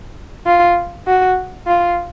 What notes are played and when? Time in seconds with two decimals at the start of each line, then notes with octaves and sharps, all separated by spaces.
0.46 F4
1.07 F#4
1.67 F4